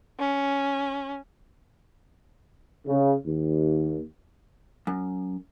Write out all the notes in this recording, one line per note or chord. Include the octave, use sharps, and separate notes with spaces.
C#4
C#3
D#2
F#2